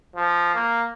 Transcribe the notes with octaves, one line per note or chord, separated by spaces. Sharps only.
F3
A#3